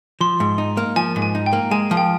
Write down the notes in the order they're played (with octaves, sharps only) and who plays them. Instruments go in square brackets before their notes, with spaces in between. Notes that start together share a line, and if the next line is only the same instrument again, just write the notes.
[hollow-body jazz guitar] F3 [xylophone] C6
[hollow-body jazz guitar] G#2
D#4
A#3
[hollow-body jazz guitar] F3 [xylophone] G#5
[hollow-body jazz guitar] G#2
[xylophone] G#5
[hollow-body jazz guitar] D#4
[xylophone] G5
[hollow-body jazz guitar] A#3
[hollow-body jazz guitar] G#3 [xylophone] G#5
[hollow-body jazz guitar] F3
[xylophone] G5